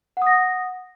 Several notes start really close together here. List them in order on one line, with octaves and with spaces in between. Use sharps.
F#5 D#6 A#6